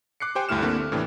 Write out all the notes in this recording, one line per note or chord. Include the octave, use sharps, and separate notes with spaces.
D6 F#6 C7 C#7
G4 C5 G5 G#5
D2 G2 A3 E4 F6 E7
D3 A#3 C4
A3
A2 C3 E3 D4